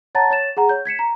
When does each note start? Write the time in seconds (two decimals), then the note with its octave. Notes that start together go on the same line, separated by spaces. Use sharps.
0.15 C#5 F#5 A5 A#5 A6
0.30 C#5 A6 E7
0.57 G#4 F#5 A#5
0.69 C#5 G6
0.85 G#6 B6 C#7 E7
0.99 A#5